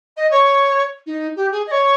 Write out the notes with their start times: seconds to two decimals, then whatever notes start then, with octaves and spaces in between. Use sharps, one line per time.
0.17 D#5
0.31 C#5
1.06 D#4
1.36 G4
1.51 G#4
1.66 D#5
1.71 C#5